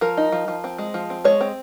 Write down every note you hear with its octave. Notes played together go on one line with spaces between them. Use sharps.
F3 A#4
D#4
F3
F3
C4
G#3
F3
C4
G#3 C#5
C4